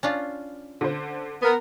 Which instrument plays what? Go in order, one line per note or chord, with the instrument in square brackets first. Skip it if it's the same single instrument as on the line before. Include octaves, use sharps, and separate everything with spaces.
[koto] C#4 D4 F4
[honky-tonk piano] D3 C5
[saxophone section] B3 A#4